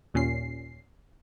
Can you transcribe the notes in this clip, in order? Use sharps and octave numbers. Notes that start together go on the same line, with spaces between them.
D#2 A#2 C#4 C7